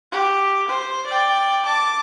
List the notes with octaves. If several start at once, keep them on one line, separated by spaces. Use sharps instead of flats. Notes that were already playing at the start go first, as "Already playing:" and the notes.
G4
C5
D5 G5
A5 D6